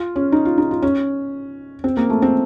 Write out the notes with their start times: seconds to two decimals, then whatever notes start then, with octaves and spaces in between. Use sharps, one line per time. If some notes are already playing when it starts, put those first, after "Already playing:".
Already playing: F4
0.16 C#4
0.32 D#4
0.45 F4
0.58 D#4
0.71 F4
0.82 C#4
1.84 C4
1.97 A#3
2.10 A3
2.22 C4